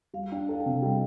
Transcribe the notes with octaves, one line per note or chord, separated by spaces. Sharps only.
G3 F5
F5
D4 G5
A4 F5
G5
C3
F5
G3 D#5